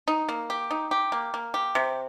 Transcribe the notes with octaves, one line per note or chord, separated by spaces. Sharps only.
D#4
A#3
G4
D#4
G4
A#3
A#3
G4
C3